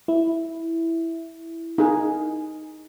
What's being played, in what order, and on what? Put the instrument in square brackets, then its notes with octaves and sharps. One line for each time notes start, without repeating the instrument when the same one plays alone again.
[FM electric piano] E4
[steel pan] D#4 G#4